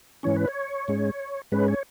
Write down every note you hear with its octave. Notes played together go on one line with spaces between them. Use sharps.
G#2 E3 C#4 C#5
B4
C#5
G#2 G#3 C#4
G#2 G#3 C#4 B4
C#5